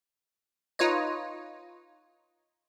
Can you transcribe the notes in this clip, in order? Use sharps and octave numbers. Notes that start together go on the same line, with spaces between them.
D#4 F4 B4 C#5 D#5